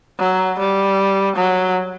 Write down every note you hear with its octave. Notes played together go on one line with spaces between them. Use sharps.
F#3
G3
F#3